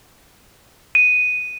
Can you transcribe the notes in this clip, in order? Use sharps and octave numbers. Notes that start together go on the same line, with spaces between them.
D#7